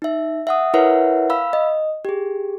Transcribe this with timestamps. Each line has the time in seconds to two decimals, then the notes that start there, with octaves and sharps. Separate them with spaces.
0.02 D#4 E5
0.47 E5 F#5 D#6
0.74 E4 A#4 B4 C#5 E5 F#5
1.30 F5 B5 E6
1.53 D#5
2.05 G4 G#4